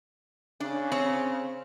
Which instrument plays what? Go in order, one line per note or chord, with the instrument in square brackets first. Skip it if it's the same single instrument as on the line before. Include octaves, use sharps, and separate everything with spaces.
[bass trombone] C#3 [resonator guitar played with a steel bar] D4
[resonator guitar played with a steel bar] C4 C#5